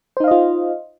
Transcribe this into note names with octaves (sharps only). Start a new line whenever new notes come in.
D#4 F4 C5 D#5 F5